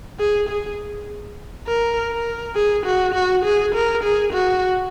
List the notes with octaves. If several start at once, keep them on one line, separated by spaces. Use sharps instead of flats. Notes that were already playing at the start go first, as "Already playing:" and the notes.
G#4
G#4
A#4
A#4
G#4
F#4
F#4
G#4
A#4
G#4
F#4